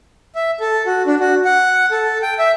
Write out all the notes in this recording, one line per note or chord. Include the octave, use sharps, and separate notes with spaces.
E5
A4
F#4
D4
F#4
F#5
A4
G5
E5